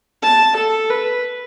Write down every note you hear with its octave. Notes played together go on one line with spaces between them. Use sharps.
A5
A4
B4